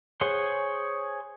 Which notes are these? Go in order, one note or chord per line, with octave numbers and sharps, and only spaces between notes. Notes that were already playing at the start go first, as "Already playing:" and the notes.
G#4 C5 C#5 F#5 C6